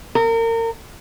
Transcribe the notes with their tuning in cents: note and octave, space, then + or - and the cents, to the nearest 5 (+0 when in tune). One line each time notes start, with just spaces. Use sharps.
A#4 -35